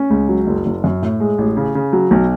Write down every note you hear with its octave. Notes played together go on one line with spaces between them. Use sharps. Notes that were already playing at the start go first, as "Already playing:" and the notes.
Already playing: C#4
C#2
F#3
F#1
F#1
F#2
A2
G#3
A1
C#3
C#3
F#3
B1